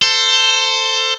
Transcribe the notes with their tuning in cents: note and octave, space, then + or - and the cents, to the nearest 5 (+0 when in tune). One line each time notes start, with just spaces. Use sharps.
A4 +20 C5 +0